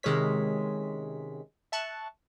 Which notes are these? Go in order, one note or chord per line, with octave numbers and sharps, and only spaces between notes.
C3 D#3 G#3 C#4 C#5 B6
E5 A5 C#6 F#6